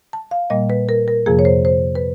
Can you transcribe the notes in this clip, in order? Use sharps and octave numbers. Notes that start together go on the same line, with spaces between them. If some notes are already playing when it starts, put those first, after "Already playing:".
A5
F5
A#2 G3 A#3 D#5
B4
A#4
A#4
F2 C3 F3 A#3 G#4
C#5
C5
C5
B4